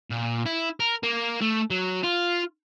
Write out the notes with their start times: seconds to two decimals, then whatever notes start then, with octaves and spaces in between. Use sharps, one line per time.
0.11 A#2
0.46 E4
0.80 A#4
1.03 A#3
1.41 A3
1.70 F#3
2.04 F4